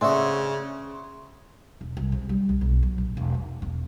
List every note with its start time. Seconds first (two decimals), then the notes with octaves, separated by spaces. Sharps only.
0.01 C#3 D4 F#4 C5 E5 G#5 C6 D#6
1.81 E1
1.97 C2
2.12 C3
2.29 G3
2.49 C#2
2.61 B1
2.83 F#3
2.98 A#1
3.17 E1
3.34 D#4
3.62 E1